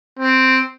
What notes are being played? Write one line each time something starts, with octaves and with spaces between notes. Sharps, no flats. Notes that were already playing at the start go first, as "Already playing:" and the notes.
C4